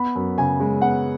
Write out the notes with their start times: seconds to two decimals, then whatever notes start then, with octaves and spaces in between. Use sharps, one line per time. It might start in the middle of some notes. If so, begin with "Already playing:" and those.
Already playing: B3 B5
0.15 F#2
0.38 C#3 G#5
0.60 G#3
0.82 B3 F#5